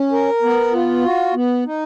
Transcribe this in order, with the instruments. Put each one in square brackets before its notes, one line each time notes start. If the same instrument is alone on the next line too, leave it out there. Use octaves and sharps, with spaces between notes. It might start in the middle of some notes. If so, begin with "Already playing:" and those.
Already playing: [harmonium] C#4
A#4
B3
F4
F#4
B3
D#4